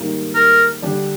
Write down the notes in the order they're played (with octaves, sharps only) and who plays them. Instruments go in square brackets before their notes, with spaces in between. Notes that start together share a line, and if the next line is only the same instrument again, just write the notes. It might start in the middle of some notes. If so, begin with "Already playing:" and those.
Already playing: [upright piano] G#2 D#3 G3 A#3
[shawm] A#4
[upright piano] D3 G3 D4 G4